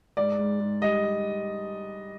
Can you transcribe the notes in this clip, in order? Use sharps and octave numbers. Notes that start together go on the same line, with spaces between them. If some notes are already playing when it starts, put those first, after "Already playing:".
G#2 D5
G#2
G#2
G3 D#5